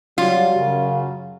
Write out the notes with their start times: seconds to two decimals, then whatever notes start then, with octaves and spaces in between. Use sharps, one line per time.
0.18 F#3 G3 F4
0.55 F#2 C#3 F#3